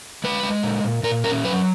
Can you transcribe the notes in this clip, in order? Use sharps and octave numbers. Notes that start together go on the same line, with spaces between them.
G#3 B4
G#3
A#2
A#2
A#2 A#4
C#4 A#4
F#3 B4